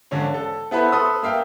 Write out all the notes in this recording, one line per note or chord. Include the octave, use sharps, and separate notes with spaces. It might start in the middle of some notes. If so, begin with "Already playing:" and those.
G#1 D3 C#4 D4 C#5
A4
B3 E4 A4 B4 C5
A4 B4 C6 D#6
A#3 E5 F5 G5